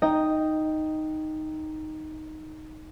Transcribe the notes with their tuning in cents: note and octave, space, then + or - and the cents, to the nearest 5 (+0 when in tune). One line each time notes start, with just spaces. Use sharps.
D#4 +0 D#5 +0 G5 +0